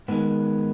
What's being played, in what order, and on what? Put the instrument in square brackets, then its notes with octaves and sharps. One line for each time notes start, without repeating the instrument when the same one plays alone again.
[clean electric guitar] G#2 D#3 G#3 B3